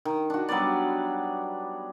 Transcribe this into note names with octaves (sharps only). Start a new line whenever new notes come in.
D#3
D4 F#4
F#3 G3 B3 D5